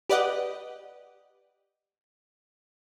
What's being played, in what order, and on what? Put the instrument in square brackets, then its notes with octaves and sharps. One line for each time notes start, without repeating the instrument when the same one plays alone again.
[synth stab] G4 B4 D5 D#5 F#5